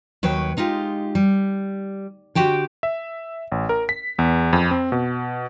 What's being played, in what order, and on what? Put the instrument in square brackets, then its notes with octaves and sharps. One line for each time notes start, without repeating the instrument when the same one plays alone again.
[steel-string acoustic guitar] D#2 F#3 B4 C#5 G5
G#3 D#4 F4 G4
G3
D3 F#4 G4 G5
[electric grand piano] E5
A1
A#4
B6
E2
F2
C4
B2